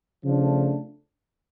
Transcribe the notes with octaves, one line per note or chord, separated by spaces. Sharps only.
C#3 F3 A3 D4